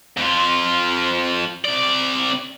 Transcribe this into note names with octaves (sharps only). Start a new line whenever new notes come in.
F2 F4
C3 D5